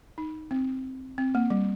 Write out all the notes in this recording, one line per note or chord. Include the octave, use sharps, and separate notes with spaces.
D#4
C4
C4
A#3
G3